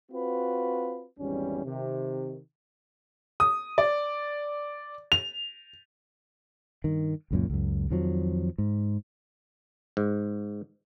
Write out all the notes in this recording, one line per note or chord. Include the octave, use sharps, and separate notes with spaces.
C4 F4 F#4 B4
G#1 E2 G3 C#4
C3 D#3
D#6
D5
F7
G2 D#3
C#2 F#2 A#2
C#2 F#2
F2 D#3 F3 F#3
G#2
G#2